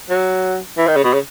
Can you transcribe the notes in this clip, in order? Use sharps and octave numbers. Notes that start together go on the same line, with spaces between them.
F#3
E3
D#3
C#3
B2
C#3